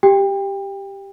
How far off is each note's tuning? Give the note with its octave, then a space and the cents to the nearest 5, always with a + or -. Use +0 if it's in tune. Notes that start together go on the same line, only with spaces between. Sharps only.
G4 +0 G5 +25